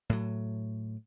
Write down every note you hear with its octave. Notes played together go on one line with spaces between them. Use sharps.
A2 F#3